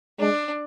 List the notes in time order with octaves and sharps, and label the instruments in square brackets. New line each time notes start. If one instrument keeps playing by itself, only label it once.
[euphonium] G#3 [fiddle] D4